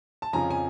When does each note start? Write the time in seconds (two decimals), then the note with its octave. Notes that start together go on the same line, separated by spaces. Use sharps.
0.22 A5
0.33 F2 C#3 F3 G#5 A#5
0.51 G#5